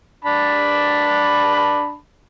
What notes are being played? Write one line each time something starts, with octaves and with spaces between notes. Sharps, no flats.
D4 A5 B5